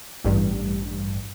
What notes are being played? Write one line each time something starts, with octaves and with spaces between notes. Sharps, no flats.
A1 G2